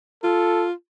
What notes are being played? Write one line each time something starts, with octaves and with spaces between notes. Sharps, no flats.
F4 A4